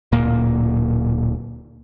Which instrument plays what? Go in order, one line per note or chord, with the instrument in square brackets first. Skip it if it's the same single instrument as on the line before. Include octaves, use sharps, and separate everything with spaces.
[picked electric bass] D1 A#2 A#3